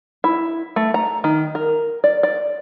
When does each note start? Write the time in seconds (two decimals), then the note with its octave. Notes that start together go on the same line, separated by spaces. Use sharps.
0.24 E4
0.76 A3
0.94 A#5
1.24 D#3
1.55 A#4
2.04 D5
2.23 D5